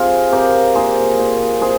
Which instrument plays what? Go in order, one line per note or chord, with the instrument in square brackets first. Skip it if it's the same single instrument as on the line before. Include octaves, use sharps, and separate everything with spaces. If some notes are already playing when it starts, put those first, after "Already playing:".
Already playing: [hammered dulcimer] C3 F4 G#4
C3 G4 A#4
A#2 G#4 C5
A#2
C3 G#4 C5